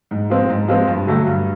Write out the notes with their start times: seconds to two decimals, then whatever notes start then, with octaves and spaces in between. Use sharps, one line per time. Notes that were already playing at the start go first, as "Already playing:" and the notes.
0.11 G#2
0.30 F3 G#3 C4
0.49 G#2
0.68 F3 G#3 C4
0.88 G2
1.07 D3 F#3 A3
1.26 G2